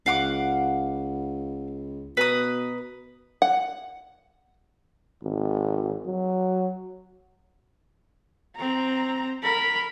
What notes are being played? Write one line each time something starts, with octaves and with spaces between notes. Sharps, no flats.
C#2 F5 F#5 D6
B2 B4 A#5 D#6
F#5
G#1
F#3
C4 A#5
A#4 B5